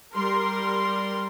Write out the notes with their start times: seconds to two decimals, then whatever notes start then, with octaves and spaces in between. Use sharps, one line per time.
0.15 G3 A#4 C6